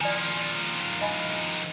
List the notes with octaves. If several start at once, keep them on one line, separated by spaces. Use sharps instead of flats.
D#3 F3 D5 G#5
D#5 G#5 B5